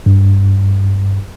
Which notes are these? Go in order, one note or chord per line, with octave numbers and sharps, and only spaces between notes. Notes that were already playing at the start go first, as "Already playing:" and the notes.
G2